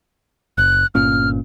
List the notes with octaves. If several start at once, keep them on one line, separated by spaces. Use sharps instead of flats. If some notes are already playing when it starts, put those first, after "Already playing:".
F#1 F#6
G1 A#2 C#4 F6